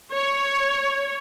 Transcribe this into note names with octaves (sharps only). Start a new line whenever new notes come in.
C#5